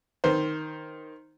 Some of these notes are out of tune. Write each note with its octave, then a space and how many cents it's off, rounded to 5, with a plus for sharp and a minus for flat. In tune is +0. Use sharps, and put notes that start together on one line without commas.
D#3 +0 C5 +5